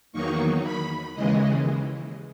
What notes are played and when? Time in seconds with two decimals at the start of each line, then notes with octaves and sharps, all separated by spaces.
0.12 E2 D#3 F#3 A#3 D#4 C#6
0.63 B5
1.15 D#2 C#3 E3 G#3 D#5